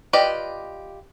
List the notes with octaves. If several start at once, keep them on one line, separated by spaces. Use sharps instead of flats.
F4 G4 B4 D5 D#5